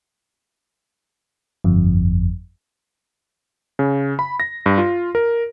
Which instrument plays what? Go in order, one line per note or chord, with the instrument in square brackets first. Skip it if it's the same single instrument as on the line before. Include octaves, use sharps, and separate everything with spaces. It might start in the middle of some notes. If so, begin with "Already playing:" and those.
[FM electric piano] G1 F2
[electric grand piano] C#3
B5
A#6
G2
F4
A#4